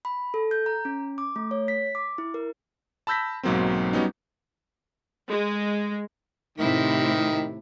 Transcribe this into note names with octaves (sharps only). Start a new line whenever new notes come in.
B5
A4
G6
A#5
C#4
D6
A3
C#5
B6
D6
E4
A#4
A5 B5 E6 G6 A#6 B6
B1 G#2 F#3 A#3 C4
F#3 G3 B3 C#4 D#4
G#3
A2 C3 D#3 E4